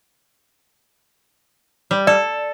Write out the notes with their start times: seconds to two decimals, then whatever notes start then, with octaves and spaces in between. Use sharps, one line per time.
1.91 G3
2.07 A4 D5